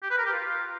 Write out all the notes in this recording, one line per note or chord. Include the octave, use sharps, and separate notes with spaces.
G4
B4
A#4
G4
F4